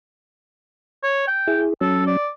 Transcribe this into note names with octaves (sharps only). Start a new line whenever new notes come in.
C#5
G5
E4 G#4
F#3 C#4 A4
D5